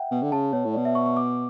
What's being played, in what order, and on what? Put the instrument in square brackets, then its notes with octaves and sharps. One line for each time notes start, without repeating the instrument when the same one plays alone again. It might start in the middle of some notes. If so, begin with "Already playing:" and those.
Already playing: [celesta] E5 F#5 G5
[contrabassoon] B2
D3
[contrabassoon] C#3 [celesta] A5
[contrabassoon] B2 [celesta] C#5
[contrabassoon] A2
[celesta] D5
[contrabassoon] B2
[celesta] E5
C#6
C#6
D6